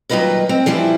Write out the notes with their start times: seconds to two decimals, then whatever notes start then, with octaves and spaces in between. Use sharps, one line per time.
0.09 D#2 F#3 G3 F4 B4 D#5
0.49 C4
0.66 E3 F3 G3 E4